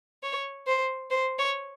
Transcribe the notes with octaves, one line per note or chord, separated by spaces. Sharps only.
C#5
C5
C5
C#5